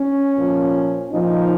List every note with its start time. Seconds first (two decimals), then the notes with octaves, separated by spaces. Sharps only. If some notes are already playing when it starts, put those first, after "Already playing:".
Already playing: C#4
0.36 A#2 F3
1.12 A#2 F3 D#4